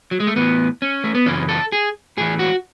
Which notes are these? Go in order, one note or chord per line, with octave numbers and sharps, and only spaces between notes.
F#3
G#3
A3
A2 E3 B3
C#4
A3
B3
F#2 C#3 E3 C#4
A4
G#4
A2 E3 G#4
F#4